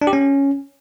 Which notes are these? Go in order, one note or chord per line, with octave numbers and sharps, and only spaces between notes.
D4
G4
C#4